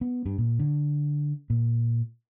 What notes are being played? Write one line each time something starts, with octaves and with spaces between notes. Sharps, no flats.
B3
G2
A#2
D3
A#2